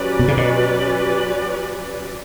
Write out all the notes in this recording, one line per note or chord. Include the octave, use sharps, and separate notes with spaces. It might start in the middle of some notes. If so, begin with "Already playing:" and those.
Already playing: F#3 C#4 G4 B4 D5
B2
C#3
B2